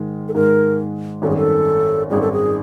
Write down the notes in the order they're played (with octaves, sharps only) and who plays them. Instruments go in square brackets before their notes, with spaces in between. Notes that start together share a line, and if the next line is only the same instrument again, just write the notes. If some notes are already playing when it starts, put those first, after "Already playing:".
Already playing: [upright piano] G#2 D#3 G#3
[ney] A4
[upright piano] G#2 D#3 G#3 [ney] A#4
[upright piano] G#1 F#2 D#3 G3 [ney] A4
[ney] G#4
A4
[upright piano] G#1 F#2 D#3 G3 [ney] G#4
[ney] A4
G#4